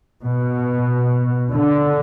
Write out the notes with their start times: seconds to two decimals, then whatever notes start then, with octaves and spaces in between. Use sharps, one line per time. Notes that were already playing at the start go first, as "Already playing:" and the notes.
0.24 B2
1.54 D3